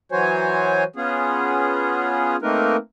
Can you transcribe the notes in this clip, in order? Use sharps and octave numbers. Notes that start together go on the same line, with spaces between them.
E3 F#3 F#4 C5 C#5 G#5
B3 C#4 F4 G#4
A3 A#3 C4 D#4 A#4 B4